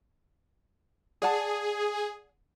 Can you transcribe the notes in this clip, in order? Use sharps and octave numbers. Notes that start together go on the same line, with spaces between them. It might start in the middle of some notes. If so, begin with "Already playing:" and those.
G#4 D5 F#5 A5